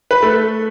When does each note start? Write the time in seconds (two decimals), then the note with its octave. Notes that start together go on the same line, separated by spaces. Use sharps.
0.11 B4
0.23 A3 A4